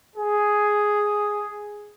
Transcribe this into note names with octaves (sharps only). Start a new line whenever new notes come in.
G#4